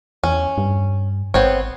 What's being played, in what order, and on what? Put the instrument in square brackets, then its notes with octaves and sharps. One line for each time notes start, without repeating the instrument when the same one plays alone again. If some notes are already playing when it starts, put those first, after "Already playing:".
[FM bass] E2 [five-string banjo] C#4
[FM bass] G2
[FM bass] G#1 [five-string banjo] B3 C4 C#5